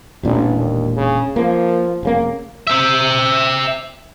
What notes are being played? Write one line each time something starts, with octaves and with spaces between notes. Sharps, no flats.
E1 A1 A#2 D4
D#2
C#3
F3 A#3
F1 C#3 A#3
C5 E5